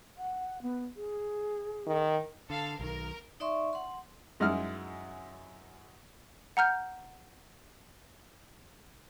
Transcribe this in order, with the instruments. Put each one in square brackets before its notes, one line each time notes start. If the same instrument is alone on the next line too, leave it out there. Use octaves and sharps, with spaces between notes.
[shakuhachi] F#5
B3
G#4
[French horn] D#3
[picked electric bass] D3 [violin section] A4 F5
[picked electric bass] B1 D#3 [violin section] A#4
[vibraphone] D#4 D5 E5 C6 C#6
F#5 C6
[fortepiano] F#2 G#3 D#4 E4 F6
[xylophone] F#5 A#5 F6 G6